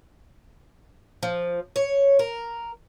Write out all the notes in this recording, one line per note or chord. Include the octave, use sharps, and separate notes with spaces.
F3
C#5
A#4